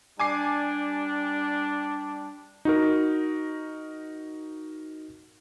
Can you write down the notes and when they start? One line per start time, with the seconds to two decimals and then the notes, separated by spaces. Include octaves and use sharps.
0.20 G3 D4 G#5 D6 C7
2.65 D#4 F#4 A#4